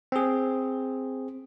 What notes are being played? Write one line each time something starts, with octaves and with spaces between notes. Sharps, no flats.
C4 G#4